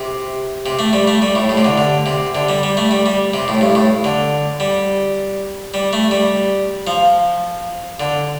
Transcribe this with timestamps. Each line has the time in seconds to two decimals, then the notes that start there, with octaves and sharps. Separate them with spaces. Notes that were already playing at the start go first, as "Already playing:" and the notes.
Already playing: C3
0.66 C3
0.79 A3
0.93 G3
1.07 A3
1.22 G3
1.35 A2
1.49 A2
1.57 C3
1.65 D3
1.78 D3
2.06 C3
2.35 D3
2.49 G3
2.63 G3
2.77 A3
2.91 G3
3.06 G3
3.34 C3
3.48 A2
3.61 G2
3.75 A2
4.04 D3
4.60 G3
5.74 G3
5.93 A3
6.11 G3
6.87 F3
8.00 D3